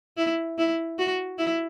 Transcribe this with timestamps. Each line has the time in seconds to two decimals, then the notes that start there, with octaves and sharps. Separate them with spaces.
0.17 E4
0.58 E4
0.98 F#4
1.38 E4